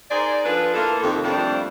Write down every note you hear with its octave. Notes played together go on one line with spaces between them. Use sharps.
D#4 G#4 A#4 C5 D5
F3 D4 F4 A4 B4
A#3 E4 F4 A4
F2 C3 D#3
F2 G3 A3 A#3 D4 C5